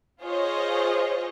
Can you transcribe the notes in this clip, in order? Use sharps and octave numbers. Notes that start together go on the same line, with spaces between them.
F4 G#4 C5 C#5 D#5